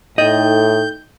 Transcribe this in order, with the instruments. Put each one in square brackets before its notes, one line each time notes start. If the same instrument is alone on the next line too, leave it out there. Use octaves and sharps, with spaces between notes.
[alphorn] A2 [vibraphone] D#4 A4 G5 [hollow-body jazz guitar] D#5 [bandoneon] G6